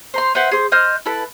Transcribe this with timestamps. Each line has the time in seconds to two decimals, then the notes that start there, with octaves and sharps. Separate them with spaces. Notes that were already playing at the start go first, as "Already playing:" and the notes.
0.14 C5 A#5 C6
0.35 B4 C5 E5 F#5
0.52 G#4 C5
0.72 C5 D#5 F6 F#6
1.06 E4 A4 B4 A5